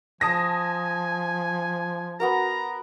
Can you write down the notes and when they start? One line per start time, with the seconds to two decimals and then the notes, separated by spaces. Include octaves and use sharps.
0.21 F3 G#5 A5 D#6 A#6
2.20 B3 F#4 A#4 A#5